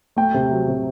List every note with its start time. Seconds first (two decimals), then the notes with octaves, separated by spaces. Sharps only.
0.16 A3 G5
0.34 C3
0.51 F#3
0.68 C3